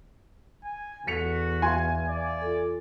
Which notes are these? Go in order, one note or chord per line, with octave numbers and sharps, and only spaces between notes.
G#5
E2 F#4 A4 B6 C#7 F7
E5 F5 G#5 C6
D5
F4 A4